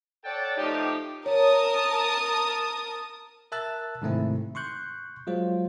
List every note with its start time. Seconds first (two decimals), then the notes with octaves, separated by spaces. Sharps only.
0.24 A4 C#5 D5 F#5 G5 A5
0.56 F3 A3 D#4 G4
1.26 A#4 C#5 A5 D#6
3.52 A#4 E5 A5 E6 F#6 A6
4.02 G#2 C3 D#3 A3 C4 E4
4.55 C6 C#6 F#6 G6
5.27 F#3 G#3 F4 C5